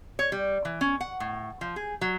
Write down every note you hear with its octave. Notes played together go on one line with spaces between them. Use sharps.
C#5
G3
E3
C#4
F#5
A2
F3
G#4
F#3